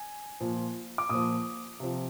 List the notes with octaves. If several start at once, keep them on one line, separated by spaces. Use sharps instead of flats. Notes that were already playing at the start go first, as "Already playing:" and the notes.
Already playing: G#5
A#2 F3
D6
A#2 F3 D#6
C3 F3